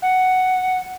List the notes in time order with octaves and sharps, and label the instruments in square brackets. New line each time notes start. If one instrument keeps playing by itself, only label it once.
[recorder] F#5